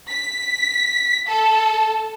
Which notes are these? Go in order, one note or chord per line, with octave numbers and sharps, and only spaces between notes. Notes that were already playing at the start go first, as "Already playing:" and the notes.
B6
A4